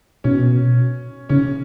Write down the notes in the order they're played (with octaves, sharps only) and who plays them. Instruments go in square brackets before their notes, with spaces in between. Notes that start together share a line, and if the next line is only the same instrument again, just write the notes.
[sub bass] B2 [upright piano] C#4
[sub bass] C#3 [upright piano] C#4